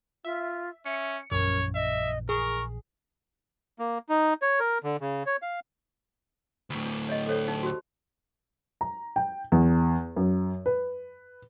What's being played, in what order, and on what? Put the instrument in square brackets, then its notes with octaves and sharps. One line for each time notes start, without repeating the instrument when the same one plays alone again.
[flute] F4 [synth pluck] E5
[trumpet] C#4 [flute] E5 [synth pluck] C#7
[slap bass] A#1 E3 [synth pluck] F#2 [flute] A#4 [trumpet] C#5
[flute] D#5 [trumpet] E5
[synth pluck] G#4 [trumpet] A#4 [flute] C#6
[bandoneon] A#3
D#4
C#5
A#4
D3
C#3
C#5
F5
[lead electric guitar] D2 A2
[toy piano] D4
C#5 D#5
A4 C5 C#5
D#4
F#4 G4 C5
[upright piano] A#5
G5
E2
F#2
B4